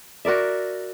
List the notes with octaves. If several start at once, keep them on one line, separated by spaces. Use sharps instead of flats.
F#4 A#4 D5 E5